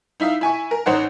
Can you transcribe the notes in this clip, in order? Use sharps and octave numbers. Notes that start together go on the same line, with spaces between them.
D#4 E4 E5 F5
E4 G#5 C#6
A#4
A1 D#4 C5 C#5 F#5